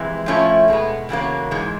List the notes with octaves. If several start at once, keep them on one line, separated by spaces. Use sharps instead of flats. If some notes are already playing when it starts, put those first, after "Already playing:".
Already playing: F2 C3 E3 G#3
A2 F3 A3 C#4 E4
B2 G#3 B3
E2 C#3 F#3 A#3
G#2 E3 G#3